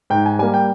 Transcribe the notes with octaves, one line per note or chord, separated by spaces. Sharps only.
G#2 G5
G#5
G3 A#3 G#5
G5